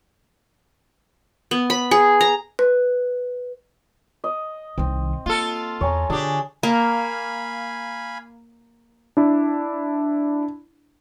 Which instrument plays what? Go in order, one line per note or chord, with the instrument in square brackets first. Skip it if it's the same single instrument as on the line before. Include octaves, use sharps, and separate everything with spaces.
[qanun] B3
B5
G#4
A#5
[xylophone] B4
[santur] D#5
[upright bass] C2 D#3 [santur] C4
[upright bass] A#3 [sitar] F4 A4
[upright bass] E2 [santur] C#5 G#5 A#5
[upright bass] D3 [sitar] D4 G4 [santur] G#4
[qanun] A#3 [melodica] F5 G#5 B5
[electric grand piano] D4 E4